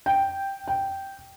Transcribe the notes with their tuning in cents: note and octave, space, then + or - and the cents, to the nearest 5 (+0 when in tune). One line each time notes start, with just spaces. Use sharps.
G5 +0
G5 -5